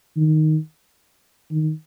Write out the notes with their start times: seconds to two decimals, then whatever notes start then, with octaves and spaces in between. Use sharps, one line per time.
0.17 D#3
1.51 D#3